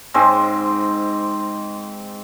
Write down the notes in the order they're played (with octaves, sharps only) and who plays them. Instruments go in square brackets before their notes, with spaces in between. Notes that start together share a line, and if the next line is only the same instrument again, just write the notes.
[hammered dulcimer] G#2 G#3 C4